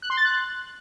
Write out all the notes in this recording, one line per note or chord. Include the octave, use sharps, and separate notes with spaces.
F#6
C6
A6
F#6